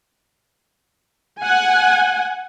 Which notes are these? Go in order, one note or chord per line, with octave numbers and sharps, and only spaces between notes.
F#5 G#5